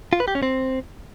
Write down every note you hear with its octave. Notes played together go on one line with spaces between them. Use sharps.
F4
B4
G4
C#4
C4